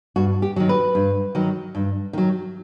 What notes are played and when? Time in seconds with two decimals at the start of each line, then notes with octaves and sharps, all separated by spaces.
0.16 G2 F#4
0.42 G4
0.56 D#3 F#3
0.69 B4
0.95 G2
1.35 D#3 F#3
1.75 G2
2.13 D#3 F#3